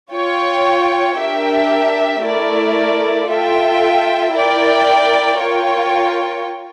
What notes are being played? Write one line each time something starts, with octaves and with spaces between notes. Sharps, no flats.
F4 C#5 G5
D4 G4 A#4 E5 G5
A3 E4 A#4 D5
F4 A4 E5 G5
E4 A#4 D5 G5
F4 A#4 C#5 G5